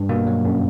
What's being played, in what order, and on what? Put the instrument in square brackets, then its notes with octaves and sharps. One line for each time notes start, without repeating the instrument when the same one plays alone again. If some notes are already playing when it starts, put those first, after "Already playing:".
Already playing: [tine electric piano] G2
[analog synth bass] B2 [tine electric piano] A#3
[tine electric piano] F#3
F#2